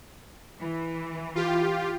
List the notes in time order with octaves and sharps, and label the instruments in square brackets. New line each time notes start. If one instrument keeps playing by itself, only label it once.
[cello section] E3
[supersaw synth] F4 G4